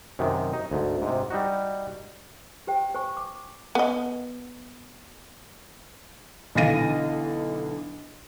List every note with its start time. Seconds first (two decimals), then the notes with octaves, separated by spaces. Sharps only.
0.19 F#2 C3 D#3
0.53 D#4
0.71 D2 G#2
1.02 G#2 C3
1.30 G3 D#4 F#4
2.67 G4 C5 G5
2.95 C5 G#5 C#6
3.17 D6
3.75 B3 D#5
6.55 B1 D3 E3 F5 A#6 D#7